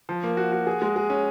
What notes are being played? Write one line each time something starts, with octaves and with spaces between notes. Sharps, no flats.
F3
A#3
F#4
F#4
G#4
G#3
G#4
C#4